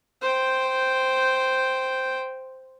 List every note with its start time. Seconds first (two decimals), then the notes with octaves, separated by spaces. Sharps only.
0.21 C5 G5